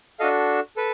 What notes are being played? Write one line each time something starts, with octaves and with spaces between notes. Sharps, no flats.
D4 F#4 A4 D#5 F5
A4 B4